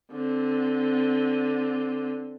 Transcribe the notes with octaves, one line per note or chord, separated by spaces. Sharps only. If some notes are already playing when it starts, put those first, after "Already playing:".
D3 C4